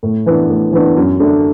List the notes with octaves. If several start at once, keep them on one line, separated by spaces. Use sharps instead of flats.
A2
E3 B3 D4
A2
E3 B3 D4
F#2
D3 A3 D4